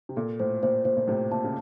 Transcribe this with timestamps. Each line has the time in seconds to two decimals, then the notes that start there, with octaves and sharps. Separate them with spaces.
0.09 C3
0.16 A#2 A4
0.39 A2 C5
0.63 A#2 C5
0.85 A#2 C5
0.97 A#2
1.08 A2 C3 C5
1.31 A#2 A5
1.44 C#3